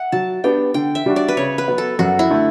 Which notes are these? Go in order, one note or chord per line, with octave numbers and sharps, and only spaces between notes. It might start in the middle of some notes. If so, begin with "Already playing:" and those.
Already playing: E5 F#5
F#3 A5
B3 D4 G4 G5
D3 G5
E5
G3 D4 F#4
D5
B4
C#3 C#5
B4
F#3 B3
A4
F#2 F#4
E4
D3 A3